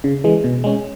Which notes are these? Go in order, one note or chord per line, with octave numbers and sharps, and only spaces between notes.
C#3
E3 G#3
B2
G#3 C#4